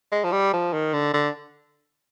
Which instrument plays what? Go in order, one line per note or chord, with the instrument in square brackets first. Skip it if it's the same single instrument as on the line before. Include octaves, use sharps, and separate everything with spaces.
[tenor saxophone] G#3
F3
G3
F3
D#3
D3
D3